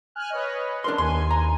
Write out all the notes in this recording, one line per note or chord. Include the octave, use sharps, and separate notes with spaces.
G#5 F6 F#6
B4 C#5 D#5
D4 A#4 C6
D#2 G#5 C6
A#5